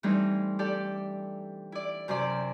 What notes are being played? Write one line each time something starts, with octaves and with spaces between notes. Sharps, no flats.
E3 G3 A3 C4 D4 D#4
G4 A4 D5
E4 D5
F#2 C3 C5 D5